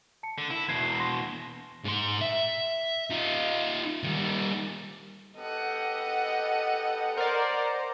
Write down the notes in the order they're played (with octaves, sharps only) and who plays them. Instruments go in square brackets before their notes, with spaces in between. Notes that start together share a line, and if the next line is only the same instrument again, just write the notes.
[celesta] A5 C#7
[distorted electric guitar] D3
E4
[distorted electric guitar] E2 B2 [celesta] G#6 C7
[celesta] C6 A#6
[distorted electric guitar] G#2 C6
E5
D#4 F4
D#3 G3
[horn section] B3 G4 A4 [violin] D#5 F#5
[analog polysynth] A#4 D5 [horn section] C5